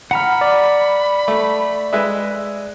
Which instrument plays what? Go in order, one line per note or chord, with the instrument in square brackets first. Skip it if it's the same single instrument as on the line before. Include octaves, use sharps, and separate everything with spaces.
[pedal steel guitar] F#5 A#5 F6 [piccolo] B5
[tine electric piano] D5
[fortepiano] A3
G#3 B4 E5